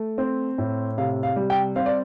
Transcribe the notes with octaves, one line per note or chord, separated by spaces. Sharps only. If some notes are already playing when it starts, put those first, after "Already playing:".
Already playing: A3
C4
A2
C3 F5
F5
G3
G5
C4 F5
D5